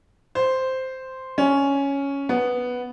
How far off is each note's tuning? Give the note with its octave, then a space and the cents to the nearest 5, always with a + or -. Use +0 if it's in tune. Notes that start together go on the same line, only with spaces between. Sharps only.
C5 -5
C#4 +5
B3 +0